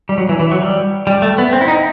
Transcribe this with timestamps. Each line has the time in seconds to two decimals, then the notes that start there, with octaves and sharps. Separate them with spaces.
0.09 G3
0.18 F#3
0.29 E3
0.40 E3
0.51 F#3
0.62 G3
1.07 G3
1.22 A3
1.38 B3
1.53 C4
1.61 E4
1.68 D#4